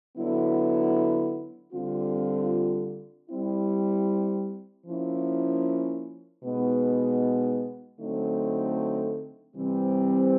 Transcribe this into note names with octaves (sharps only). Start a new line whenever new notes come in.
D3 F#3 B3 E4
D3 G3 C4 F4
G3 C4 E4
F3 A#3 C#4 E4
B2 G#3 B3 D#4
D3 F#3 A3 C4 D#4
C3 E3 G3 C4